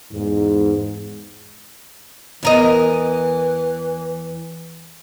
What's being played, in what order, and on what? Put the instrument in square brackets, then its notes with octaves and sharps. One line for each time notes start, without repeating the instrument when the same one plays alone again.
[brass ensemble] E2 G#2
[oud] E2 A#4 D#5 [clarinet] E3